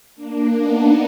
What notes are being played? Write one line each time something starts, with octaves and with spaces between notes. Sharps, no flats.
A#3 D4
B3 D#4